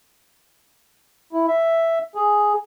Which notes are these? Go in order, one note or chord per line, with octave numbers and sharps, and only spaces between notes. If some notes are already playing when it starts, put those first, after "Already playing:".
E4
E5
G#4